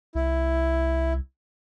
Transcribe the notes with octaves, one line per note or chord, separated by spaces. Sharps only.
C2 E4